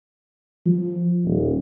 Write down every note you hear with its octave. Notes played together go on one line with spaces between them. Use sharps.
F3
D#1